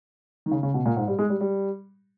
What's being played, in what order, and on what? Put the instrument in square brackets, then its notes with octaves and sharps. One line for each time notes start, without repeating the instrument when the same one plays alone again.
[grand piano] D#3
C#3
C#3
B2
A#2
G#2
G3
G#3
G3
G3